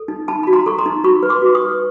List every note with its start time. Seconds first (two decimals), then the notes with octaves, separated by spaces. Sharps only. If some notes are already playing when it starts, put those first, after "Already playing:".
Already playing: A4
0.08 D#4
0.28 D#4 A5 B5
0.43 F#4 B5
0.53 A#5 C6
0.66 A4 C#6
0.79 A#5 C6
0.86 D#4
1.04 F#4 B5 C#6
1.23 B4
1.30 C6 D6
1.42 F#4
1.55 C#6 D#6
1.62 B4